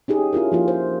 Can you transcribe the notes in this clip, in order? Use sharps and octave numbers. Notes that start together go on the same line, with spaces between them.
C#4 D#4 G4 G#4
C#4 E4 F4 A#4
F3 A#3 F4
C5